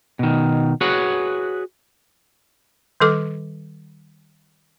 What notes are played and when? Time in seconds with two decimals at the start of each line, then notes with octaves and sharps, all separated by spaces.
0.19 B2 D#3
0.81 F#4 G#4 B4 C#5 F#5
3.00 D#3 G3 A4 D6